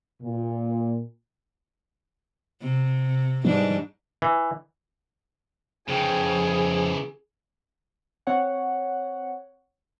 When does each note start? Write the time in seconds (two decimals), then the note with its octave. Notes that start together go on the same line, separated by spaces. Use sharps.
0.23 A#2
2.61 C3
3.45 G#2 E3 G3 D4
4.22 E3
5.88 F2 C#3 E3 G#4 G5
8.27 C4 C#5 F#5